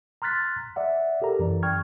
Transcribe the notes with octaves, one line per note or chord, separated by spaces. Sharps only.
A#5 C6 F6 F#6 A6 B6
D5 E5 F#5
G4 A4 A#4 A#5
F#2 E3 D5
G5 C#6 F6 G#6